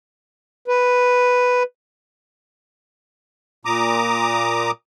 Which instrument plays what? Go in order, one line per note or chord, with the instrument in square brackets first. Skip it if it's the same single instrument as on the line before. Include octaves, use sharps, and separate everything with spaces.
[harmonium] B4
[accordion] A#2 A#5 D6 D#6